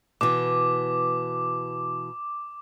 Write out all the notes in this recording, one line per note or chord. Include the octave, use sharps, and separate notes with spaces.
B2 E3 D6